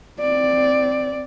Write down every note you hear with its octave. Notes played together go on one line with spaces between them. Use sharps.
C4 D5